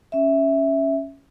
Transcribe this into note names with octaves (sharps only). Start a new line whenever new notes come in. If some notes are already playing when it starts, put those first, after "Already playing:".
C#4 E5